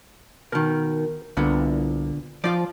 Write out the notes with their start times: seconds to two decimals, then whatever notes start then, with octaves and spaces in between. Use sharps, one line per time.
0.52 B2 D#3 A#4
1.37 C2 A#2 D3 B3
2.44 F3 F4 D5